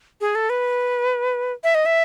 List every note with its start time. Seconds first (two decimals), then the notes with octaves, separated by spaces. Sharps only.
0.21 G#4
0.35 A4
0.50 B4
1.64 E5
1.75 D#5
1.86 E5